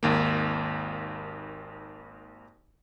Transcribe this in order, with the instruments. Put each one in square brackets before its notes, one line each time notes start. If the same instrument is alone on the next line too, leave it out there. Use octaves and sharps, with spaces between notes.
[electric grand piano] G#1 D#2 A#3